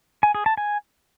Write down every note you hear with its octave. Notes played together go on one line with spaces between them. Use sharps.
G#5
G#4
A5
G#5